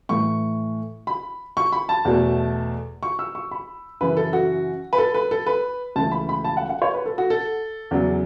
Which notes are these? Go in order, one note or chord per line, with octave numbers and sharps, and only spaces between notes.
A2 E3 A3 C#6
B5
C#6
B5
A5
E2 B2 A3
C#6
E6
C#6
B5
F#2 C#3 E3 B4
A4
F#4
B4
A4
B4
A4
B4
C#2 C#3 E3 A3 A5
B5
B5
A5
F#5
F#5
C#5
B4
A4
F#4
A4
E2 C#3 F#3